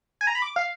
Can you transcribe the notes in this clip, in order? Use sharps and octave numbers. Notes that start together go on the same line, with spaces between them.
G#5
A#5
B5
D6
F5